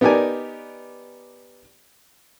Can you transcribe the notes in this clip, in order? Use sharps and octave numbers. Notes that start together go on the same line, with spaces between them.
B3 D#4 G4 A#4 D5 G#5